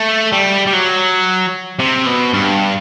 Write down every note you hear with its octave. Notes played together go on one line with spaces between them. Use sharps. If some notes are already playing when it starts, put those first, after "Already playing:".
Already playing: A3
G3
G3
F#3
C3
B2
G2